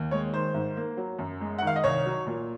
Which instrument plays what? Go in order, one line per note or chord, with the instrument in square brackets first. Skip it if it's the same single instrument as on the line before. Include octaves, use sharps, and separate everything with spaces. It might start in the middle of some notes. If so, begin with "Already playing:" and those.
Already playing: [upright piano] D#2
G#3 C#5
D#3 C5
G#2
A#3
F#3
F#2
G#3
F#5
D#3
F5
D#5
C2 C#5
F#3
A#2